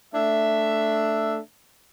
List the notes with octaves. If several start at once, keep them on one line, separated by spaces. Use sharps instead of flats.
A3 D4 E5